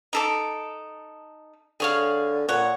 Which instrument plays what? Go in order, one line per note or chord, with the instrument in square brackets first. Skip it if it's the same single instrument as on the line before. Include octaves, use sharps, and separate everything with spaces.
[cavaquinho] D#4 A4 D6
[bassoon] D3 [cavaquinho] G#4 C#5 F5
[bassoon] A#2 [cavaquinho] C#5 F#5